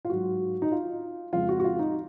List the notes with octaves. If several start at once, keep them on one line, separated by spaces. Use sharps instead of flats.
F4
G#2 F#3 F#4
D#4
F4
F2 C#3 G#3 F4
F#4
F#4
F4
D#4